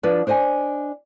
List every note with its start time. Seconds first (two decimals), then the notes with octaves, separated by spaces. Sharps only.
0.03 F3 D4 B4
0.27 D4 C5 D#5 G5 G#5